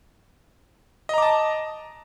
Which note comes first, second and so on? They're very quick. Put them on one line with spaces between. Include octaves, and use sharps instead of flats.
D#5 A#5 D6 A5